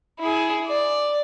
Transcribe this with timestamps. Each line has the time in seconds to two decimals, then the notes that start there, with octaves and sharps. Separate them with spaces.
0.20 E4 G#4
0.67 D5